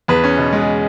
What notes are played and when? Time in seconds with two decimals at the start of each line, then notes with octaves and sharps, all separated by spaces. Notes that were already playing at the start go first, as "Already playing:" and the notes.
0.08 E2 B4
0.24 C#4
0.38 B2
0.52 G#3